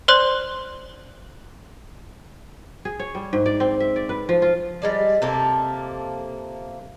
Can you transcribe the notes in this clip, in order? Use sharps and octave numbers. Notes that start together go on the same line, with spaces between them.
C5 D5 C6 F#6
G#4
C#5
G3
G#2
D5
C4
E5
D5
B4
F3
F4
G3 G#3 D5
C3 F3 A#3 A4